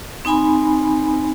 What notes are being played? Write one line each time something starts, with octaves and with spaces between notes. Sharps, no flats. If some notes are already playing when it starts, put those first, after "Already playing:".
C4 D#4 G#5 B5